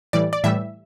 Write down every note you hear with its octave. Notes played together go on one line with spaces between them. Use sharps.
A2 E3 G3 D5
D5
A2 E3 G3 E5